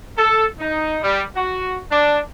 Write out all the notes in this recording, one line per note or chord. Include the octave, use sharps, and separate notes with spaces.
A4
D#4
G3
F#4
D4